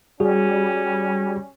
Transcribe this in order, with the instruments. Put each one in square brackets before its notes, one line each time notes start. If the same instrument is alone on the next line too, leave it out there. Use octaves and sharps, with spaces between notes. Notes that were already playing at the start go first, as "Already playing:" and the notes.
[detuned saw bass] G3 [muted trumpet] C#4 [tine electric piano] F#4 G#4